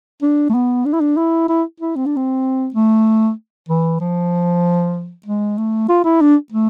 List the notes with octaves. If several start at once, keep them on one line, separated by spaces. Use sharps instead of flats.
D4
A3
B3
D4
E4
D4
E4
E4
E4
C4
D4
C4
A3
E3
F3
G#3
A3
F4
E4
D4
A3